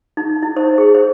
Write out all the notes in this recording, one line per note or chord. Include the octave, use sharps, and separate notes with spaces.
D#4
E4
C5
G#4
C5